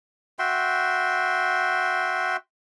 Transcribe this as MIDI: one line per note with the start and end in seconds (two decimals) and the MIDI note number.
0.39 2.36 66
0.39 2.36 76
0.39 2.36 79
0.39 2.36 84